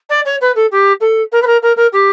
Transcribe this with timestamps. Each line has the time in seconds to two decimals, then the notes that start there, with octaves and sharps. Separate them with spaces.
0.09 D5
0.25 C#5
0.41 B4
0.55 A4
0.71 G4
1.00 A4
1.32 A#4
1.42 B4
1.46 A#4
1.62 A#4
1.76 A#4
1.92 G4